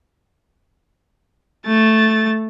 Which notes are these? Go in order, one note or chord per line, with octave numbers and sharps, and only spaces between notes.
A3 A6